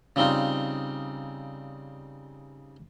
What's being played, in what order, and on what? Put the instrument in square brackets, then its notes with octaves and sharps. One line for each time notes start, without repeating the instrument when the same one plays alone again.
[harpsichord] C#3 G3 C4 D#4 F4